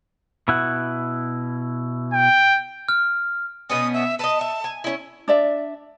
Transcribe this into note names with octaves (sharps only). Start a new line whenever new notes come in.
B2 E4 F#5
G5
F6
B2 B3 C#4 D#6
E5
B4 D#5 A5
E5
G#5
C#4 E4
D4 D5 E5